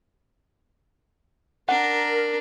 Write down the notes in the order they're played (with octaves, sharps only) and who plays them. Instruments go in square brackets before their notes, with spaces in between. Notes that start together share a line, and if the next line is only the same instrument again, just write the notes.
[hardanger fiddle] D4 [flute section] A#4 [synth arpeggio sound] F#5